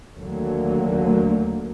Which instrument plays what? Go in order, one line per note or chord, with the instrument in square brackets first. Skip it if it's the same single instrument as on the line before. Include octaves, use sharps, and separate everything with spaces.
[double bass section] D#2 D3 F#3 A3 A#3